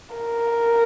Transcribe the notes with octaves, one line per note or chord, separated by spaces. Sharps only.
A#4